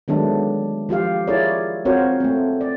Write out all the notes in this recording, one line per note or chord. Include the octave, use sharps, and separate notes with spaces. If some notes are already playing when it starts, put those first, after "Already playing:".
D#3 F#3 G#3 A3 B3 D4
F3 F4 G4 F5
E4 F4 G#4 A#4 C#5 D5
C4 F4 F#4 A#4 C5 C#5
A3 C4
D5